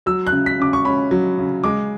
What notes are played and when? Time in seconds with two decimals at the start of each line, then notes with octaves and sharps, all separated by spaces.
0.06 F#3 E6
0.27 F#6
0.32 C#3
0.46 B6
0.59 C#3 D6
0.73 C#6
0.85 C#4 B5
1.11 F#3
1.38 C#3
1.64 G#3 D6